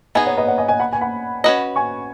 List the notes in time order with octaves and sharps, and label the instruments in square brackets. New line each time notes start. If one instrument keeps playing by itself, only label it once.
[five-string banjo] B3 D#4 G#4 [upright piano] D#5 G#5
[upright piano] C#5 F#5
B4 D#5
C#5 F#5
D#5 G#5
D#5 G#5
F#5 B5
G#5
F#5 B5
[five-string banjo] C#4 F#4 B4 D#5
[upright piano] G#5 C#6